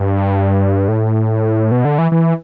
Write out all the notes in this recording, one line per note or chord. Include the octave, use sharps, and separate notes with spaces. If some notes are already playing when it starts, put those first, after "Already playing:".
Already playing: G2
A2
B2
D3
E3
E3